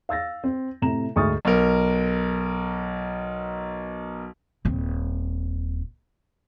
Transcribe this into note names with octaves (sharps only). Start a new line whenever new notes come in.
F5 E6 A6 A#6
C4
A2 C3 A#5 E7
D2 G#2 C#6 D#6 F6 A6
B1 A#4
D#1 C4